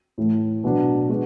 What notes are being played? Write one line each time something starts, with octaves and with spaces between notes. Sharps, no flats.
A2 E3 A3
B2 F#3 B3 D4
G#3 B3 D4 F#4